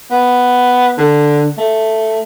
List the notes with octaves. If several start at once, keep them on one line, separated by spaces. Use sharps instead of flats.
B3
D3
A3